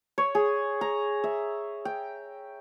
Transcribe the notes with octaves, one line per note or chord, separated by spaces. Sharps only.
C#5
G#4
A#5
E5
G5